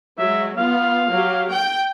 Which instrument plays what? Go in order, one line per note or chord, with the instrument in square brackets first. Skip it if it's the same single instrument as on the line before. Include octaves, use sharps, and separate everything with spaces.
[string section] F#3 G#3 [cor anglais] E5
[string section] B3 F4 [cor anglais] F5
[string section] F#3 G4
G5 G6